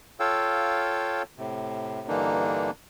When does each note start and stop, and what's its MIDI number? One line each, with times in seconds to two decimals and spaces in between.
0.20 1.22 65
0.20 1.22 69
0.20 1.22 73
0.20 1.22 77
0.20 1.22 79
0.20 1.22 88
1.38 2.08 45
1.38 2.08 48
2.08 2.71 43
2.08 2.71 50
2.08 2.71 52
2.08 2.71 58
2.08 2.71 62
2.08 2.71 63